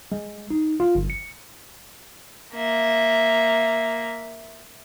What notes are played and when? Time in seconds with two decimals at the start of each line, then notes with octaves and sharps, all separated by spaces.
0.12 G#3
0.50 D#4
0.80 F4
0.95 G1
1.10 C#7
2.54 A#3 E5